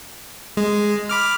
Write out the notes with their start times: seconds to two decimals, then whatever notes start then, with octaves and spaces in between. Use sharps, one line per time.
0.57 G#3
1.09 B5 D6 F6